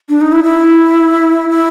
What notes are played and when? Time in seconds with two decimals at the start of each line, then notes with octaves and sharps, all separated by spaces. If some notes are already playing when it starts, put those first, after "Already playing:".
0.09 D4
0.21 D#4
0.32 E4
0.44 E4
1.49 E4